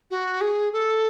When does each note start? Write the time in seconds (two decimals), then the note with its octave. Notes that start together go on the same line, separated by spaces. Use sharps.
0.10 F#4
0.41 G#4
0.73 A4